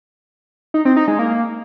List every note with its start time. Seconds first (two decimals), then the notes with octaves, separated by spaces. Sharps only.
0.74 D#4
0.85 C4
0.97 D#4
1.08 G#3
1.19 A#3